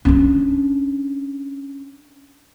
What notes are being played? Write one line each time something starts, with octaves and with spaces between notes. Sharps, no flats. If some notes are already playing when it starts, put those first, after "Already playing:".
C#4 D4